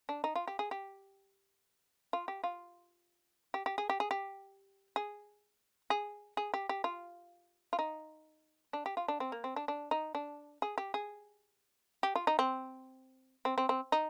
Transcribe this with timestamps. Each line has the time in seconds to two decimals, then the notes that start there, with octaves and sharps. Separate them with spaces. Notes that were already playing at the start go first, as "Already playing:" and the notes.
0.09 D4
0.24 D#4
0.36 F4
0.48 G4
0.59 G#4
0.71 G4
2.13 F4
2.28 G4
2.44 F4
3.54 G4
3.66 G4
3.78 G#4
3.90 G4
4.00 G#4
4.11 G4
4.96 G#4
5.90 G#4
6.37 G#4
6.54 G4
6.69 G4
6.84 F4
7.73 F4
7.79 D#4
8.73 D4
8.86 G4
8.97 F4
9.08 D4
9.20 C4
9.32 A#3
9.44 C4
9.56 D4
9.68 D4
9.91 D#4
10.15 D4
10.62 G#4
10.78 G4
10.94 G#4
12.03 G4
12.16 F4
12.27 D#4
12.39 C4
13.45 C4
13.58 C4
13.69 C4
13.92 D#4